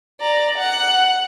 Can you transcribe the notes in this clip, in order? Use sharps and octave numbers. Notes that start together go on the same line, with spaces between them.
D5 A#5
F#5